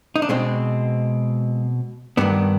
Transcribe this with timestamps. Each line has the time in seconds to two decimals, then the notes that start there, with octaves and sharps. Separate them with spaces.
0.16 D#4
0.22 D4
0.29 B2 G#3 C4
2.17 G2 D#3 B3 D4